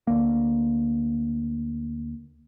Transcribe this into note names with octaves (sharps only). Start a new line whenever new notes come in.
D2 A#3